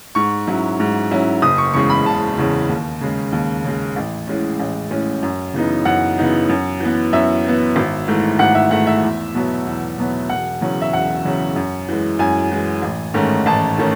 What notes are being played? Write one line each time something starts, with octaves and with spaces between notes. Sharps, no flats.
G#2 C#6
F#3 C#4 E4
G#2
F#3 C#4 E4
F#1 D#6
C#6
E2 C#3 G#3 C#6
B5
F#1 A5
E2 C#3 G#3
D#2
C#3 G#3
D#2
C#3 G#3
A1
A2 G#3 C#4
A1
A2 G#3 C#4
F#2
C#3 E3 B3 D#4
F#2 F#5
C#3 E3 B3 D#4
F#2
E3 B3
F#2 E5
E3 B3
G#1
G#2 E3 A3
G#1 F#5
E5
G#2 E3 A3 F#5
E5
E2
B2 F#3 B3
E2
B2 F#3 B3
E1 F#5
E2 C#3 F#3 C#4
E5
E1 F#5
E2 C#3 F#3 C#4
F#2
E3 G#3
F#2 G#5
E3 G#3
A1
G#2 D#3 A3 C#4
A1 A5
D#3 A3 C#4